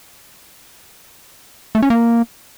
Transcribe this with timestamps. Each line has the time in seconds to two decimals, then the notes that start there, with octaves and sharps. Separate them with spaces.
1.75 A3
1.83 C#4
1.90 A#3